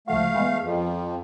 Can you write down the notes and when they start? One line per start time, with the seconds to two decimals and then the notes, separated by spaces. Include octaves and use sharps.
0.08 C#2 F3 A3 F#4 F5
0.35 E3 G#3 B3
0.61 F2